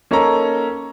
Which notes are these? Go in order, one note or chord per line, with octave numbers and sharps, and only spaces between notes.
A#3 C#4 D#4 A4 C#5 A#5